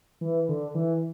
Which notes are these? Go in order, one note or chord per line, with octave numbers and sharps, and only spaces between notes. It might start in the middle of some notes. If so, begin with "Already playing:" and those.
E3
D3
E3